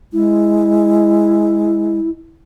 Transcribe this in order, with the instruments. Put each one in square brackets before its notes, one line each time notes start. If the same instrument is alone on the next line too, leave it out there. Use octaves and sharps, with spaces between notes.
[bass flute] G#3 [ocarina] E4